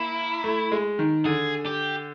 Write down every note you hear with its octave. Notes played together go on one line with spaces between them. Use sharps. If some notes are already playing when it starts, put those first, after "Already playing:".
Already playing: A#3 E4
A3
G#3
D#3
D3 G#4
G4